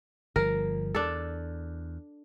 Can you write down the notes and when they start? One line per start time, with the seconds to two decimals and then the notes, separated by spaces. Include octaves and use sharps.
0.36 G1 F3 A#4
0.95 E2 D4 A4